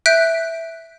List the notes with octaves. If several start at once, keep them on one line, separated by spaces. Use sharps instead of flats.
E5 F#6 G6 B6 D7